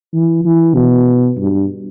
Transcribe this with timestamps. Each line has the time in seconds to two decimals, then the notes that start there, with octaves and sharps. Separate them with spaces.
0.14 E3
0.45 E3
0.76 B2
1.38 G2